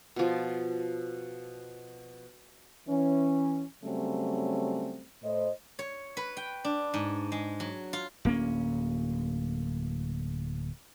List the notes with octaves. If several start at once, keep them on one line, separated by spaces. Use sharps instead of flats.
B2 F3
E3 C#4
C#3 F#3 G3 A3 C4 C#4
A2 C5 D#5
C#5
B4
G5
D4
G#2
G#3
F#3
F4
D1 A#3 C#4